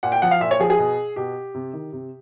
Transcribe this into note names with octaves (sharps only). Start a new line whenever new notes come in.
A#2 F#5
G5
F3 F#5
F5
A#2 E5
C#5
F3 G#4
G#4
B2
B2 G4
C3
D#3
C3